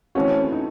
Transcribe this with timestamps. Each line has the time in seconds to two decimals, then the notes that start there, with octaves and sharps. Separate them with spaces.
0.15 E3 A3 C4 C#4 F#4
0.52 D#4